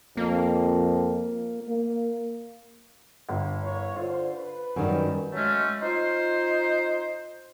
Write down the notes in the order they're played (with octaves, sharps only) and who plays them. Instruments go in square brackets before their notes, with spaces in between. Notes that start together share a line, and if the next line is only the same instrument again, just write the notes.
[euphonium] F2 [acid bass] A#3
[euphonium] A#3
[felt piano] G1
[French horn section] E4 A#4 C#5
[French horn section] D3 C5 [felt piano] F4
[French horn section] B4
[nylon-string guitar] F#2 D#3 G3
[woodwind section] F#3 G#3 A3 C#4
D#4 F4 C5